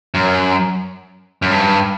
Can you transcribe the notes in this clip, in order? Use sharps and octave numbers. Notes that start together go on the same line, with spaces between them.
F#2
F#2
G2